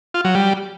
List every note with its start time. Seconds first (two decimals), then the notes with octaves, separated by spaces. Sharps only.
0.14 F4
0.25 F#3
0.35 G3